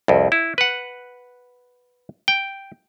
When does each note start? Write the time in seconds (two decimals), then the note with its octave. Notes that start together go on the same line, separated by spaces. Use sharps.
0.08 C2 F2
0.32 E4
0.58 B4 F#5
2.28 G5